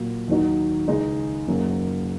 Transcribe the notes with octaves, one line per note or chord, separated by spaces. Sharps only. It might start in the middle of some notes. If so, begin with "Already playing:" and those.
Already playing: A#2 F#3 A#3 F#4
D#2 D#3 F#3 D#4 F#4
C#2 C#3 G#3 D#4
F#1 F#2 F#3 A#3